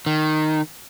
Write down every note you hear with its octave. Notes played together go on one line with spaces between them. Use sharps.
D#3